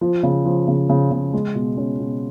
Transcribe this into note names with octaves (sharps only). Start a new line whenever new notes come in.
F3
C#3
F3
C#3
C#3
C#3
G#3
B2
C#4
B2